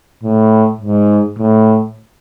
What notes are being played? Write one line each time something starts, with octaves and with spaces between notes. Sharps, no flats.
A2
G#2
A2